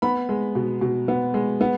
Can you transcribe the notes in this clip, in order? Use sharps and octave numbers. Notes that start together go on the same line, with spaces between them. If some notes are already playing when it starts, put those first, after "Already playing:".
B3 B5
G#3
B2
B2
B3
G#3
B3